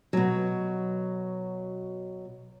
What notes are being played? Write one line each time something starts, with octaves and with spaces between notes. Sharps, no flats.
B2 F#3